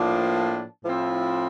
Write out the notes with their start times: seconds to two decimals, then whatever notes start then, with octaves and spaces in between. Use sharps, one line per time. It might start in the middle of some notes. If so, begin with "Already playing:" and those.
Already playing: A2 F3 A#3 D4
0.33 A5
0.84 A2 F3 C4 E4